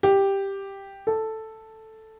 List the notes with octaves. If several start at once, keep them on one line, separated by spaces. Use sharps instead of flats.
G4
A4